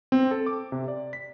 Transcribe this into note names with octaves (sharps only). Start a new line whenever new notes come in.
C4
A4
D6
C3
D5
B6